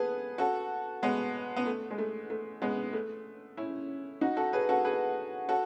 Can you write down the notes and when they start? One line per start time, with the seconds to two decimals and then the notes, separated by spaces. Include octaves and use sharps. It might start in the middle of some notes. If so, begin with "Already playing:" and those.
Already playing: B3 G#4 A4 B4
0.38 F#4 A4
1.03 G#3 B3
1.56 B3
1.66 A3
1.91 G#3
1.98 A3
2.30 A3
2.62 G#3 B3
2.93 A3
3.57 C#4 E4
4.21 D#4 F#4
4.37 F#4 A4
4.53 G#4 B4
4.69 F#4 A4
4.85 G#4 B4
5.49 F#4 A4